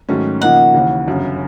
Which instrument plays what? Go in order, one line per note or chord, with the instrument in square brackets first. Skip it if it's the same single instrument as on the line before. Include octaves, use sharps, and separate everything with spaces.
[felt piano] G#2 D#3 F#3 A3 C#4
[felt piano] C#3 F3 A#3 D#4 [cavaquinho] F#5
[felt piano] D#2 C#3 E3
G1 F#2 C#3